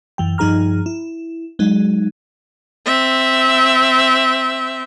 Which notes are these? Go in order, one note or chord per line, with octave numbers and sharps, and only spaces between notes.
F#2 E3 G5
G2 F3 D#4 G#4 A#5 F6
E4
F#3 G#3 D#4
C4 E5